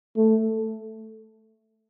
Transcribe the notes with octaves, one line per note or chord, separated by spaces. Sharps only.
A3